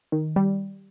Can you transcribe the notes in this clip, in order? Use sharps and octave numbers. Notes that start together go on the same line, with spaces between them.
D#3
G3